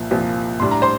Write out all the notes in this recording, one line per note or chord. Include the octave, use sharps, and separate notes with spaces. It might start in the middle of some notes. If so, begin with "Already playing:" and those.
Already playing: C2 A#2 F3
C2 A#2 F3
A2 G3 D4 C6
A#5
C5 C6